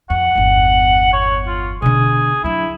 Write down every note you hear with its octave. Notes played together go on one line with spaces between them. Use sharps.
F2 F#5
G1 E2
C#5
F4
B2 D3 G#4
F#3 D4 E4